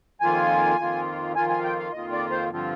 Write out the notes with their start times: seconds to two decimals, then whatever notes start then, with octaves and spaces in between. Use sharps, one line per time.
0.21 F2 D#3 A#3 F4 G#5
0.79 F2 D#3 A#3 F4
1.36 F2 D#3 A#3 F4 G#5
1.49 G#5
1.58 F5
1.64 G5
1.78 F5
1.92 F2 D#3 A#3 F4 D#5
2.12 D5
2.31 C5
2.50 G2 D3 F3 C4 F4